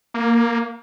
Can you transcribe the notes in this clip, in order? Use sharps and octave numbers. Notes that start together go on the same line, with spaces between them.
A#3